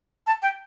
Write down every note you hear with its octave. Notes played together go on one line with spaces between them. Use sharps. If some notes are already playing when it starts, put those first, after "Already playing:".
A5
G5